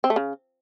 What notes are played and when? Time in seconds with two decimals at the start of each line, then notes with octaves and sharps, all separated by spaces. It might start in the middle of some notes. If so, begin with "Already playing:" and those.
0.04 C4
0.10 A3
0.16 C#3